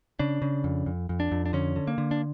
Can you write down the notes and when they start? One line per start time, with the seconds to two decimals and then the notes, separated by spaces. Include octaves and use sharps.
0.19 C#3 D4
0.42 C#3
0.64 F2
0.86 F2
1.09 F2
1.20 D4
1.31 F2
1.46 D4
1.53 D3 C#4
1.76 D3
1.87 A#3
1.98 D3
2.11 D4